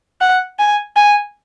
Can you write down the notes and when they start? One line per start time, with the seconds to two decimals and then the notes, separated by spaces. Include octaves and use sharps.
0.21 F#5
0.59 G#5
0.96 G#5